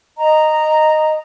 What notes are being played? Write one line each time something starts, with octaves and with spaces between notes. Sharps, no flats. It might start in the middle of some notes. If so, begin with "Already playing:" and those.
D#5 A#5